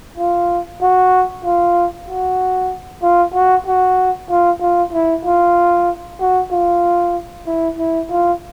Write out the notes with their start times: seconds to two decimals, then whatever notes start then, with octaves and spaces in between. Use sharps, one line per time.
0.17 F4
0.82 F#4
1.44 F4
2.08 F#4
3.03 F4
3.34 F#4
3.67 F#4
4.29 F4
4.61 F4
4.93 E4
5.25 F4
6.20 F#4
6.51 F4
7.47 E4
7.78 E4
8.11 F4